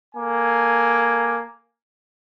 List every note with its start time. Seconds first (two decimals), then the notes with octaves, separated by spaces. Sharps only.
0.15 A#3 A4 G#5